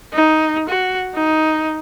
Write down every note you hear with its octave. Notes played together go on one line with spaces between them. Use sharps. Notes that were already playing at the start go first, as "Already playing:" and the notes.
D#4
F#4
D#4